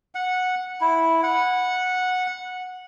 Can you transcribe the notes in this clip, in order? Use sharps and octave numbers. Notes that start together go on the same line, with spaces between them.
F#5
E4
F#5